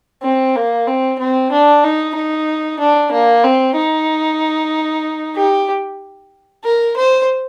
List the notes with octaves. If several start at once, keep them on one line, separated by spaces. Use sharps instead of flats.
C4
A#3
C4
C4
D4
D#4
D#4
D4
A#3
C4
D#4
G4
A#4
C5